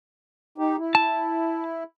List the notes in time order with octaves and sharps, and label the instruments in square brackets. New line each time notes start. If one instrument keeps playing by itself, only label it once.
[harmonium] D#4 G4
E4
[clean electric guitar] A5